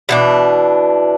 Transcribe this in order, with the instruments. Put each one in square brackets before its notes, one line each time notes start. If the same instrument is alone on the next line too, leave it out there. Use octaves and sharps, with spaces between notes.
[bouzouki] B2 E3 D4